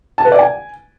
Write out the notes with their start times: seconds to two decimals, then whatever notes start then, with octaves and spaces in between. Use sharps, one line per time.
0.18 A5
0.25 B4
0.32 D5
0.39 G#5